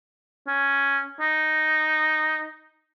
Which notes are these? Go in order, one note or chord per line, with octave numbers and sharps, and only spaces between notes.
C#4
D#4